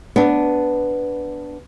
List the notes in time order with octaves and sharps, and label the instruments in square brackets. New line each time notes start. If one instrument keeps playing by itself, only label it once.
[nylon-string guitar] B3 D4